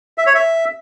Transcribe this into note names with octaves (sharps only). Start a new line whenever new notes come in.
E5
C#5
E5